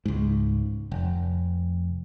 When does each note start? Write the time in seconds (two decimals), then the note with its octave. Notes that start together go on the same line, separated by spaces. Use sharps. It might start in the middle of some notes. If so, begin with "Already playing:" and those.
0.05 C#2 G#2
0.91 F1